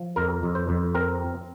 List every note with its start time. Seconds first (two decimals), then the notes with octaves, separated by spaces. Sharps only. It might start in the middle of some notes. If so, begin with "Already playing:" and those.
Already playing: F3
0.16 F2 A#4
0.43 F2
0.55 C5
0.69 F2
0.94 C4 A#4